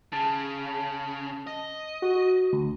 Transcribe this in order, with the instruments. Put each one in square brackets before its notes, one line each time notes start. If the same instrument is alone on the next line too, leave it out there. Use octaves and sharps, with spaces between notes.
[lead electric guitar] C#3 [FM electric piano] A5
[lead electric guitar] D#5
[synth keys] F#4
[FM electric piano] D2